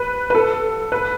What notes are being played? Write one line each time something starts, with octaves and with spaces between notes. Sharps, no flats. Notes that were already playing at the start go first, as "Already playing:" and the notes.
Already playing: B4
B4
A4
B4